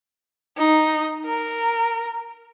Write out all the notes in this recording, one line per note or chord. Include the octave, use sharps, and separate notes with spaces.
D#4
A#4